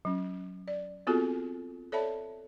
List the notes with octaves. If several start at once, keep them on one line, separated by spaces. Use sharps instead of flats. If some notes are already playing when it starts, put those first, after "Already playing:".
F#3 C#4
D5
B3 C4 F4 F#4 G#4 A4
A4 C#5 D5 E5 A5 B5